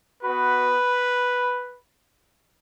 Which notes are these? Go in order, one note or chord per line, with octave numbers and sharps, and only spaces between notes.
B3 F#4 B4 B5